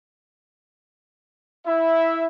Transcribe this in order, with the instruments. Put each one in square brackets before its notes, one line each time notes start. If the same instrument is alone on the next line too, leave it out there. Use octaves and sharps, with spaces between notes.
[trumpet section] E4 E5